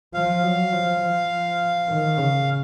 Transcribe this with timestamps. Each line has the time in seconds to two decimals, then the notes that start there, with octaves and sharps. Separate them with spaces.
0.14 F3 F5
0.43 F#3
0.73 F3
1.02 F3
1.88 D#3
2.17 C#3